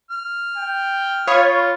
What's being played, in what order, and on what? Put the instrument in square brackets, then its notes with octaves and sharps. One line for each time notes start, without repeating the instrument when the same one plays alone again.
[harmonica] F6
[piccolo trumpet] G5
[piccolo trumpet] F4 [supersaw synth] C#5 [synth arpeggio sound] F5 B5 D#6